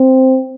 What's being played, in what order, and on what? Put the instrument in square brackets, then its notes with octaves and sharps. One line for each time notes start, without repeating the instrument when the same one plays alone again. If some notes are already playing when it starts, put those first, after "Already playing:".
Already playing: [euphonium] C4